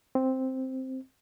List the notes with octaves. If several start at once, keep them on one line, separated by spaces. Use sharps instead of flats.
C4